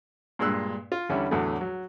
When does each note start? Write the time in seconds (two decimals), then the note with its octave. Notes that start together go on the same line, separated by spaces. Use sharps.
0.39 G2 A#2 G#3 E6 F#6
0.92 F4
1.09 E2 D3 G3 C#4 E4
1.31 E2 A2 D3 F#3 A3
1.61 F#3